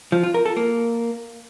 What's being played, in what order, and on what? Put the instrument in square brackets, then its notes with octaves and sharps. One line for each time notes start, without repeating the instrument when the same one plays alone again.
[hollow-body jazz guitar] F3
F4
A#4
A4
A#3